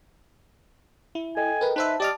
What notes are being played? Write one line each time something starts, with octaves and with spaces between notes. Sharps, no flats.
E4
A4 D#5 G5 G#5
A#4 B4
D#4 B4 C5 E5 A5
G4 D5 D#5 F6